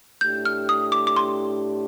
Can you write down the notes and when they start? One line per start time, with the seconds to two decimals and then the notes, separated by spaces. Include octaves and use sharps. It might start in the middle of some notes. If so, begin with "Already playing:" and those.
0.21 A2 A3 D4 G4 G6
0.45 F6
0.69 D#6
0.92 D6
1.07 D6
1.16 C6